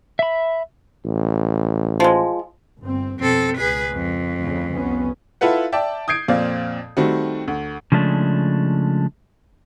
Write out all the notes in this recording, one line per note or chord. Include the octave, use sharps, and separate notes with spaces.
E5 B5
A1
F3 G#3
G1 C4
F2 B2 C4 A4
C#2 G#4 B4
F2
D2 C#3
C2 B3 C#4
E4 F4 A4 B4 F#5
D5 E5 G5 A5
D#6 G6 G#6 C7 D7
F2 A#2 C4 D5 F5
D#3 G3 A3 C4 F#4
D2
C#3 F3 G#3 A3 D4